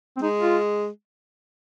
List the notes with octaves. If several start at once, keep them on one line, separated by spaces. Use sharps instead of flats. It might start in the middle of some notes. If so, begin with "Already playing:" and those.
C4
G#3 D#4
F4